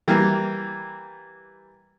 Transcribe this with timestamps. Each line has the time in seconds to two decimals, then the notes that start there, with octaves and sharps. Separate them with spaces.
0.08 E3 G3 A#3